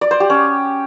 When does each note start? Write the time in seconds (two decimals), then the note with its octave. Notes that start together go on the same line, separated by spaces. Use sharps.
0.01 D5
0.11 C5
0.20 G4
0.30 C#4